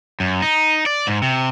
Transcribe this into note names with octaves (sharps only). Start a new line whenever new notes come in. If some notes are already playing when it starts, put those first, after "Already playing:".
F#2
D#4
D5
G#2
C3